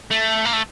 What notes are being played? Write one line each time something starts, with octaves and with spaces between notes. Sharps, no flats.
A3
A#3
A3